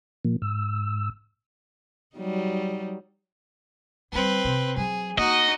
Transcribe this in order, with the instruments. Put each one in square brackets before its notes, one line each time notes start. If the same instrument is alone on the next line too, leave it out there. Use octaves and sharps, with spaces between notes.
[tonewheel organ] A#2 F3 A#3
G#2 E6
[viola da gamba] F#3 G3 D#4
[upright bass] D3 G3 [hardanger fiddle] C4 B4
[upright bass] C3
[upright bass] F#3 [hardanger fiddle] G#4
[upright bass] A#3 [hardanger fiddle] D#4 F#4 [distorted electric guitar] D#5